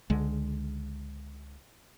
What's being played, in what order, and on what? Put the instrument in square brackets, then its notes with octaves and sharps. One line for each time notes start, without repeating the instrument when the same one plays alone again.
[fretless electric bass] C#2 D3 G#3